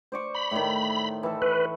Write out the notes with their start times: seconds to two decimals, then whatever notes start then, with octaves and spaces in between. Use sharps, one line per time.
0.12 C5 D5 C#6
0.35 B5
0.51 A2 D#3
1.23 E3 A4
1.42 B4 C#6